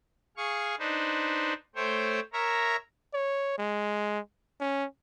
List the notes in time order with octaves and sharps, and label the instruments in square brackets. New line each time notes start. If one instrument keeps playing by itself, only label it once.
[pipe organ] G#4 F5 C#6
D4 D#4 B4 C5
A3 C5 C#5 G5
A#4 C#5 E5 A#5
[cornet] C#5
G#3
C#4